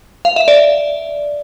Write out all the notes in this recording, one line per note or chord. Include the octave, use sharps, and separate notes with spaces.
F5
E5
D5